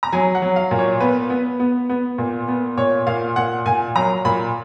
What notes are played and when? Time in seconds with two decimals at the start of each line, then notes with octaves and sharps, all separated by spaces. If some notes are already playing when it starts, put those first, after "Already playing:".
0.03 A#5
0.12 F#3 G#5
0.35 F#5
0.42 F#3
0.56 F5
0.71 A#2
0.79 C#5
1.00 B3 B4
1.30 B3
1.60 B3
1.89 B3
2.18 A#2
2.48 B3
2.77 A#2 C#5
3.07 A#2 F5
3.36 A#2 F#5
3.66 A#2 G#5
3.95 F#3 A#5
4.25 A#2 B5